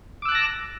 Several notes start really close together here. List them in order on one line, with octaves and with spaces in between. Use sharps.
D6 E6 F#6 A5 A#6